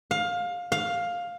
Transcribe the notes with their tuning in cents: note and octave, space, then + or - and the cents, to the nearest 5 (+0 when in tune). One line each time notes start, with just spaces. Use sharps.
F5 +20
F5 +10